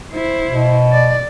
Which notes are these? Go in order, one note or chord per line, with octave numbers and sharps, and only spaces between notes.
E4 C5
B2
D5